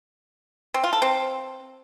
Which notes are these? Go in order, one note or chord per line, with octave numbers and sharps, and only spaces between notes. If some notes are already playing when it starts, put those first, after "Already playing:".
C4
F4
A4
C4